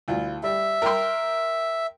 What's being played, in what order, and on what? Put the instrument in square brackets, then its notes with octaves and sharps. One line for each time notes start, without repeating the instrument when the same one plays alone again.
[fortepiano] D2 E4 F4
[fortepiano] G3 [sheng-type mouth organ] E5
[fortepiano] A#4 G5 C6